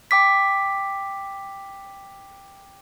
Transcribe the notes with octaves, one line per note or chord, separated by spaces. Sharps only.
G5 D6 B6